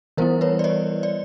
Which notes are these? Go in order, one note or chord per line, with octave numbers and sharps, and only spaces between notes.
E3 G3 B3 E4 A#4 C5
B4 C#5
D5
C#5 D#5
D5